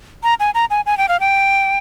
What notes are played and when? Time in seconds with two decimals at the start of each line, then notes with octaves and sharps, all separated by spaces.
0.23 A#5
0.40 G#5
0.55 A#5
0.70 G#5
0.86 G#5
0.98 G5
1.09 F5
1.20 G5